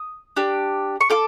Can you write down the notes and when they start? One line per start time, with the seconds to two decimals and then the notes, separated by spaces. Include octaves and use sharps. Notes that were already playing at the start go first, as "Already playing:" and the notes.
Already playing: D#6
0.36 D4 G4
1.01 C#6
1.10 F4 A4 D6